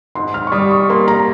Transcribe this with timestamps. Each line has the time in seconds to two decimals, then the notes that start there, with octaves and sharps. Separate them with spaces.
0.15 G#2 C6
0.34 F6
0.47 C#6
0.52 G3 D#6
0.71 C#6
0.90 A#3 C6
1.08 A#5